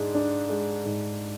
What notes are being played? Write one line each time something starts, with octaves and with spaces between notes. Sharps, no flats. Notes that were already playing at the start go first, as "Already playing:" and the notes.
Already playing: G#2 G#3 D4
D4
G#3
G#2